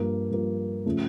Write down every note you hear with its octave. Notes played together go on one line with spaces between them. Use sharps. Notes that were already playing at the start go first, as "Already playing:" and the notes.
Already playing: G2 F3 A#3
G2 F3 A#3
C#3 F3 A3